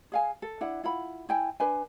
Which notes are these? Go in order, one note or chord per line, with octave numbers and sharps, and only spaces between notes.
G#4 F5 G#5
A4
D4 E4 F#5
E4 F4 F#5 B5
E4 G5 G#5
D4 B4 G#5